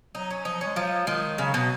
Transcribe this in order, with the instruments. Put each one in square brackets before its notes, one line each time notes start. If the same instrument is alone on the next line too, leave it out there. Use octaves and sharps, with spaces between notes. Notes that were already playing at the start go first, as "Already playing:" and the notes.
[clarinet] F#3 [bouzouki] D#4
[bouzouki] C#4
[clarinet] F3 [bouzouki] D#4
[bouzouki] C#4
[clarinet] G#3
[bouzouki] F3 [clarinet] F#3
[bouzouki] D#3 [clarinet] G#3
[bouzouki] C#3 [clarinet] F#3
[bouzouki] B2 [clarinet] F#3